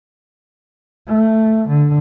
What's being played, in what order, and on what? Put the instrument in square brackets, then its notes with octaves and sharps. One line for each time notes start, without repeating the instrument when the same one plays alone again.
[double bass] A3
D3